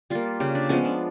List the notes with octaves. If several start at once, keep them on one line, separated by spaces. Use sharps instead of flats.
G3 A#3 F4
C#3 G4
D4
F3 G#3 B3 C#4
D4